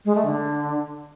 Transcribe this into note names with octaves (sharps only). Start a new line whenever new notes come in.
G#3
A3
D3